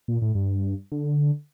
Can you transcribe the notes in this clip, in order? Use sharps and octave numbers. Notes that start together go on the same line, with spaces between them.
A#2
A2
G2
D3